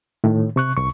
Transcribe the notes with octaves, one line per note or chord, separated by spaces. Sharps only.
A2 D#3
C3 C#6 F#6
C2 C#6